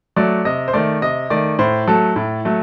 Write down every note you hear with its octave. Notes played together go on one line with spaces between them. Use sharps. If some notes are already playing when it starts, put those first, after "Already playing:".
F#3 A3 D5
C3 D#5
C5
D#3 A3 D5
C3 D#5
D#3 A3 D5
A2 C5
F#3 A3 A4
A2
F#3 A3